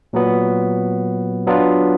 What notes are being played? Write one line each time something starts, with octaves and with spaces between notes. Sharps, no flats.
A#2 F#3 B3
F#3 B3 D4 F4